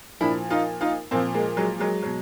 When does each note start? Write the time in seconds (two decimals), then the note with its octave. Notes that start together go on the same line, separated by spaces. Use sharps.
0.21 A#2 F3 D4 E4
0.50 D#4 F4
0.81 D#4 F4
1.11 A#2 F3 A#3 C4
1.34 G#3 A#3
1.57 F#3 G#3
1.79 F#3 G#3
2.02 B2 F#3